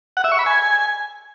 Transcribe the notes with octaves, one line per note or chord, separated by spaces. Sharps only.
F#5
E5
C#6
B5
G#5